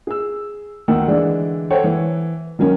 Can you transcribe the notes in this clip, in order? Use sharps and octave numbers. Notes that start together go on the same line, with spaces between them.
G#4 E6
D2 D#3 A#4 F#5 E6
D3 E3 G#3 D4
A4 C5 C#5 F#5 G5
E3
D#3 F#3 C#4 A#4